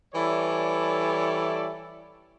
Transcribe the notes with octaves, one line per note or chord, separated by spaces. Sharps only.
E3 G3 E4 A4 C#5 D5